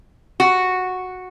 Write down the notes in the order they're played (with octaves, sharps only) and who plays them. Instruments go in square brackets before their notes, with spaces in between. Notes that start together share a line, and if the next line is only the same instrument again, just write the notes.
[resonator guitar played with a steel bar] F#4